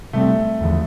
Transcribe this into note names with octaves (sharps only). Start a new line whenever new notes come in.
C3 G3 A3 C4
E2 D3 F3